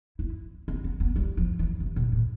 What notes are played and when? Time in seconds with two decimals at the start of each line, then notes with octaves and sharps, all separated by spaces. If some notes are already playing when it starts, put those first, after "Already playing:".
0.19 E4
0.68 C4
0.84 B3
1.00 B3
1.16 G3
1.37 F3
1.59 E3
1.80 C3
1.96 B2
2.12 A2